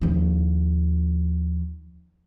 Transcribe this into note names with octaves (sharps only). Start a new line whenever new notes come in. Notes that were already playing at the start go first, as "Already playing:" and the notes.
D#2 F3